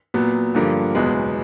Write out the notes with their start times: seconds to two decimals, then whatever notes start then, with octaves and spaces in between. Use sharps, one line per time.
0.14 A#2 F#3 B3
0.55 G2 D3 F3 A#3
0.95 F#1 E2 B2 G#3 B3